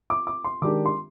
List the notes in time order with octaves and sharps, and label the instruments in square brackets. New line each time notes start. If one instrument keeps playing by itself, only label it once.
[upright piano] D6
D6
C6
[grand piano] D#3 G#3 D4 G4 A#4 [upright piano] D6
[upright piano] C6